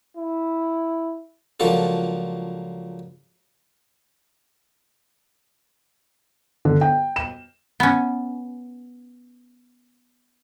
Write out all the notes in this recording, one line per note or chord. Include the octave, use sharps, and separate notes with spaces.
E4
C#2 F3 F#3 A#3 D4 A4
D3
G5
E7
B3 C#4